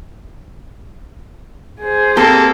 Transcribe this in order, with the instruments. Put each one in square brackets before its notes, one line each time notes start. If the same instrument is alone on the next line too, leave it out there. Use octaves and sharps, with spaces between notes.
[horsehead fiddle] G#4 C5
[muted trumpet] A#3 [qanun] C4 G4 [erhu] A4